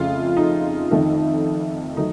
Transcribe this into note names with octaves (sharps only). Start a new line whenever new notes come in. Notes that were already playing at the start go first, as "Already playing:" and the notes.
Already playing: F2 C#3 A3 F4
D#4
F2 D#3 A3
D#3 F#3 A3 D#4